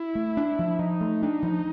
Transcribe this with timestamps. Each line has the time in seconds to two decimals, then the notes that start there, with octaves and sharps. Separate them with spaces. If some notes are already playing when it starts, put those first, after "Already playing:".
Already playing: E4
0.15 A3
0.37 D4
0.59 F3
0.79 F3 D#4
1.01 A3
1.22 D4
1.42 F3